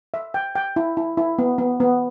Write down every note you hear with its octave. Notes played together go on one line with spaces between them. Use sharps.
E5
G5
G5
E4
E4
E4
B3
B3
B3